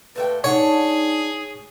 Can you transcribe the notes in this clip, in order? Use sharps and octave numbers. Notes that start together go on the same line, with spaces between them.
A#2 A3 B4 G5
D4 D#4 G#4 C#5 F#5